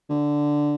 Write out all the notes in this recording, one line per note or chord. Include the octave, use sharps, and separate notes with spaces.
D3